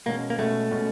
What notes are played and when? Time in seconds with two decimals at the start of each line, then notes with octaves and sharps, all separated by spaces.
0.06 B2 G#3 A#3 C#4
0.30 A#3
0.39 B2 G#3 A3 C#4
0.71 B2 G#3 C#4